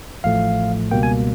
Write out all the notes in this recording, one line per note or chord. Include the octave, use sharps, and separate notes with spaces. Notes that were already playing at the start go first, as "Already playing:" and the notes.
A1 A2 F3 A3 F5
C#2 B2 G3 A#3 G5
G#5